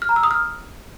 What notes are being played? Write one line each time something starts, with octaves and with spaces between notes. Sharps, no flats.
F6
A#5
E6
D#6
F6